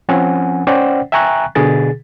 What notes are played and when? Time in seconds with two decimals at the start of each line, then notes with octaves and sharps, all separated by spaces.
0.09 F3 C4 C#4 F#5 G#5
0.67 C#4 C5 D5 F#5 G5
1.12 E5 G5 G#5 A#5 C#6 F#6
1.55 B2 D3 G#4 A6